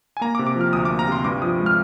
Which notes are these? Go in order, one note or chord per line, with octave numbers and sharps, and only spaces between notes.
G#5
A#3 A#5
D6
C3
D6
F3
F6
D2 D#6
D6
A#3
A#5
C3 C6
G2 D6
F3 D#6
G#3
F6